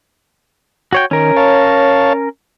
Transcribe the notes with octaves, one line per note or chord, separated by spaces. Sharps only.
F#4 C#5 G5
D#3 C#4 A#4
C#5 F5 A5